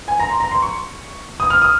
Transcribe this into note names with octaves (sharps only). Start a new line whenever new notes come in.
G#5
A#5
C6
A#5
C6
C#6
D#6
F6
D#6